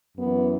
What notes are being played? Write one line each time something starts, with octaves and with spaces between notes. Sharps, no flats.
F#2 E3 B3